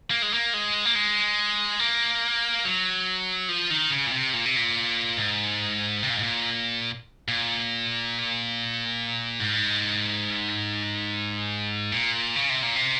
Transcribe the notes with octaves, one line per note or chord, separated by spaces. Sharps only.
A#3
G#3
A#3
G#3
A#3
G#3
A#3
F#3
F3
D#3
C#3
A#2
C3
A#2
C3
A#2
G#2
C3
A#2
G#2
A#2
A#2
G#2
A#2
C#3
C3
A#2
C3